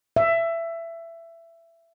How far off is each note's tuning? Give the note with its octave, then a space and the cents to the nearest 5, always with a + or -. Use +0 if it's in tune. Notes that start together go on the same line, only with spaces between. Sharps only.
E5 +20